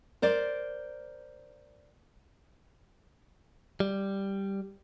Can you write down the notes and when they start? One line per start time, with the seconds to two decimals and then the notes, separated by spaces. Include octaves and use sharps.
0.22 A#4 C5 D5
3.80 G3